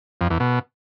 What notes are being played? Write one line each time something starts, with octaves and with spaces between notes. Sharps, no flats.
F2
E2
B2